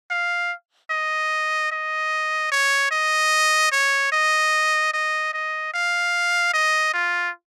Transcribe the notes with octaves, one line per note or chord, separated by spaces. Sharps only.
F5
D#5
D#5
C#5
D#5
C#5
D#5
D#5
D#5
F5
D#5
F4